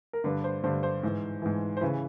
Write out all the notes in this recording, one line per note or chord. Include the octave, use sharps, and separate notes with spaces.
A#4
G2 D3 B4
C5
G2 D3 C5
C5
G#2 E3
G#2 E3
C5
C#3 E3 B4